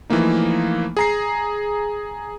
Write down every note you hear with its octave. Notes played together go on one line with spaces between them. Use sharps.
E3 F3 A3 A#3 D#4
G#4 A#5 C7